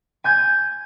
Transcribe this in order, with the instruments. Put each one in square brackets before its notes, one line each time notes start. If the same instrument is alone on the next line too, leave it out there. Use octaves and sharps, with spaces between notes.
[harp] G#5 G6 G#6